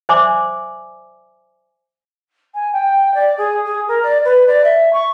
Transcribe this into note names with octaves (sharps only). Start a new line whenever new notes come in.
C5 D5 E5 G#5 C6 D6
G#5
G5
D5
G#4
G#4
A#4
D5
B4
D5
E5
C#6